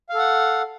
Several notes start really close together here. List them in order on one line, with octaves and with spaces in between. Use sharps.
F5 A4 F#5